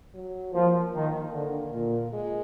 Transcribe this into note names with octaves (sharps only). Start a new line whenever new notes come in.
F#3
F3 A#3
D#3
D3
A#2
G#3